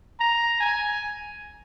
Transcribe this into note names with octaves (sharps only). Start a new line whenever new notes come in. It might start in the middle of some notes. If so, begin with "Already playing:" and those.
A#5
G#5